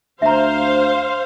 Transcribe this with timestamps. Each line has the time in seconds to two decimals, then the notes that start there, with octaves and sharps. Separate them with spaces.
0.22 D2 C5 E5 F5 A#5